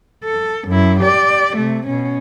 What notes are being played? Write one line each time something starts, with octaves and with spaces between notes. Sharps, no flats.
A4
F#2 E4
G4 D5
C3 A3
B2 C#4